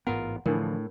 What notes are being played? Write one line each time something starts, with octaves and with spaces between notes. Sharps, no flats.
A1 G#2 B3 F4 A#4 F#5
A2 D3 E3 F3 D4 A#4